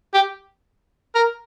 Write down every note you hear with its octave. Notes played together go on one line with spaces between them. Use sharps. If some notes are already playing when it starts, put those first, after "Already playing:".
G4
A#4